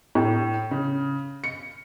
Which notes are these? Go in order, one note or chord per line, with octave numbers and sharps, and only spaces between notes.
A2
C#3
C#7